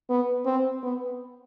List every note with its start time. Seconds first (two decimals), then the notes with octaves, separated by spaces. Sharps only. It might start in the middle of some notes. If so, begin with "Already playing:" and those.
0.09 B3
0.45 C4
0.83 B3